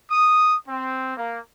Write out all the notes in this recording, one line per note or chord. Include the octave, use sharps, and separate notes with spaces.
D#6
C4
A#3